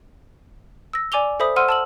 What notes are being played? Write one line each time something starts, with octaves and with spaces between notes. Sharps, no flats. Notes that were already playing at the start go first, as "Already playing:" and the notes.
E6 A#6
D5 G#5 D6 F7 G7
A4 C5 E5 B5 D#6
C5 F#5 C6 E6 F6 D#7
A5 E6 F#7